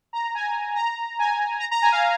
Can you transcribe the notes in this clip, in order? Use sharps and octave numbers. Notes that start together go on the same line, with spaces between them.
A#5
G#5
A#5
G#5
A#5
A#5
G#5
F5